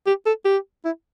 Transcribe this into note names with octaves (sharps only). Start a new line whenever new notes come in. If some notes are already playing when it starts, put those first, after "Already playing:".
G4
A4
G4
E4